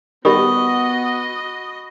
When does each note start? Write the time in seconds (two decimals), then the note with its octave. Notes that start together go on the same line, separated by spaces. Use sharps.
0.25 D#3 G3 B3 F#4 D#5 B5 C#6 D#6